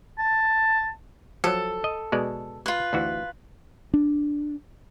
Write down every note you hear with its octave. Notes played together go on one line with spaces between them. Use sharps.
A5
F3 F#3 A4
D#5
B2 G#3 D5
F4 B4
D2 E3 F#4
D4